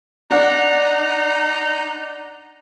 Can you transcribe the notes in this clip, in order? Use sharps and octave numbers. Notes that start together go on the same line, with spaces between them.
D4 D#4 F#5